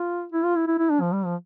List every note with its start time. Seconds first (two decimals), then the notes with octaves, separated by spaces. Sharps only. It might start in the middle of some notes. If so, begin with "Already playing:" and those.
Already playing: F4
0.32 E4
0.44 F4
0.56 E4
0.68 E4
0.79 E4
0.90 D4
1.01 F3
1.13 G3
1.25 F3